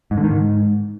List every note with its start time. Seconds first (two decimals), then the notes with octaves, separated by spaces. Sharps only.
0.11 G#2
0.18 D3
0.24 D#3
0.30 G#2